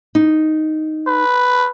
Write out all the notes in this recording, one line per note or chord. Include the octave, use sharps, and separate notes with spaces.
D#4
B4